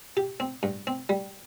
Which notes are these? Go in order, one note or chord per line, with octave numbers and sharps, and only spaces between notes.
G4
C4
G2
C4
G3